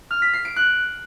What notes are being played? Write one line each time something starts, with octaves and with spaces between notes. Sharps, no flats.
F6
B6
C7
D7
F#6